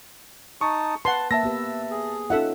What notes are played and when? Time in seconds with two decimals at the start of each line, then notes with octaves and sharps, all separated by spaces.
0.61 D#4 A5 C#6 D#6
1.05 B4 F#5 A5 C6
1.31 A#3 E5 A5 E6 A#6
1.43 B3 G4 B4
1.91 G#4
2.30 C#4 D#4 F4 A4 E5 F#5